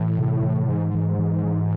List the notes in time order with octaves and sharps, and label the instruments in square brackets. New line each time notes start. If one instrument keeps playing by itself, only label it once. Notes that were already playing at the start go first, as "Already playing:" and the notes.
Already playing: [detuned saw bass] A2 [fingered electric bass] E3
[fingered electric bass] C3
E3
[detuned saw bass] G#2 [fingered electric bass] E3
[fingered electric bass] E3
E3
E3